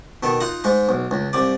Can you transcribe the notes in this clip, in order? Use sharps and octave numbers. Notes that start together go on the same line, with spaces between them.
B2 D#3 A4
D#4 F4 F#5 A#5
G#2 G#3 D#4
B1
C#2
C2 G3 D5